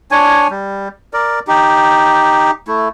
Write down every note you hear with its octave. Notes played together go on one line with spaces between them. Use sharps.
D4 C#5 G#5
G3
A#4 D5
D#4 G4
A3 E4